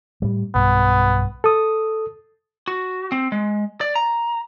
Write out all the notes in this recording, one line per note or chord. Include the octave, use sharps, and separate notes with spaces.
A2 G3
B1 G2 B3
A4 D#6
F#4
C4
G#3
D5
A#5